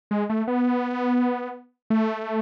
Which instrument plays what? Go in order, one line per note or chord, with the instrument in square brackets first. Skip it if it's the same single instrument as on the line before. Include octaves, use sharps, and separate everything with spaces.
[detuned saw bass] G#3
A3
B3
A3